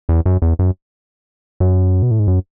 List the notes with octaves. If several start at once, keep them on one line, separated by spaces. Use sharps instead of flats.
E2
F#2
E2
F#2
F#2
B2
A2
G#2
F#2